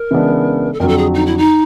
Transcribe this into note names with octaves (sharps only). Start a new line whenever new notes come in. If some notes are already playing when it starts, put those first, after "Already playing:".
Already playing: A#4
C#3 E3 G#3 B3 D4
A4
F2 D3 F#3 A#4
A4
G#4
D#4
E4
D#4